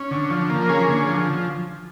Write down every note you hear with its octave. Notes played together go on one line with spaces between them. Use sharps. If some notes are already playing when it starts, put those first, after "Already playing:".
Already playing: C#4
D3
F3
A#3
C#4 G#4
D3
F3